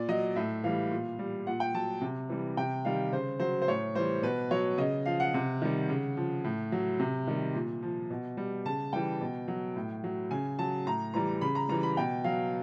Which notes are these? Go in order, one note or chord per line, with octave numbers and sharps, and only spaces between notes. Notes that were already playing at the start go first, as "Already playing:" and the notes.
Already playing: A#2 D5
F#3 D#5
A2 E5
E3 G3 F5
A#2
G3
A#2 F#5
G5
F#3 A5
C3
E3 G3
C3 G5
D#3 G3 F5
C#3 C5
F#3 C5
C5
A2 C#5
E3 G3 C5
B2 B4
F#3 C#5
C#3 D#5
F3 F5
F#5
C3
D#3 G3
C#3
F3
A2
F#3
C3
D#3 G3
A#2
F3
B2
G3
C#3 A5
E3 G3 G5
B2
F#3
A2
F#3
C#3 G#5
F#3 A5
A2 A#5
E3 G3 A#5
C#3 B5
A#5
E3 G3 A#5
B5
B2 G5
F#3 F5